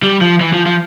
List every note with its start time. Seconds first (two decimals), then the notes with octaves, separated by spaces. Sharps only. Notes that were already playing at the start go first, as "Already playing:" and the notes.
0.03 G3
0.21 F3
0.41 E3
0.53 F3
0.66 F3